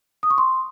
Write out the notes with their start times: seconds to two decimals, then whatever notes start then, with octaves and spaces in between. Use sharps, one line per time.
0.23 D#6
0.30 C#6
0.38 C6